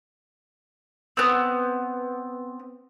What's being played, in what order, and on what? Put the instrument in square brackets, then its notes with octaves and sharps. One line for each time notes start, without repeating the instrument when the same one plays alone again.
[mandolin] B3 C4